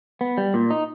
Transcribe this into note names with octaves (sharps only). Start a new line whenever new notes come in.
B3
G3
A#2
D#4